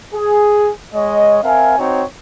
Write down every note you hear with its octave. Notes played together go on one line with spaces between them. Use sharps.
G#4
G#3 C#5 D#5
C4 A#4 E5 F5 G#5
C4 D#4 F#4 C#5